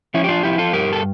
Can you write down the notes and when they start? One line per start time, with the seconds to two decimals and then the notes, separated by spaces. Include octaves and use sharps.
0.14 F3 C#4 E4
0.24 G4
0.29 D4 F4
0.43 F3 E4 G4
0.58 F4 A4
0.73 G2 G4 A#4
0.93 A4